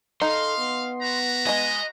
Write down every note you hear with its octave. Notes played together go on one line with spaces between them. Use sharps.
D#4 A4 F5 C6
B3
F#4 B4 A#5
G#3 D#5 G#5